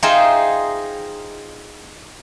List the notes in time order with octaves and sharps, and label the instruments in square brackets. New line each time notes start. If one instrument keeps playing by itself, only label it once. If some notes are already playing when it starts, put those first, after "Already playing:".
[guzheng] D#4 F4 G#4 C5 E5 G5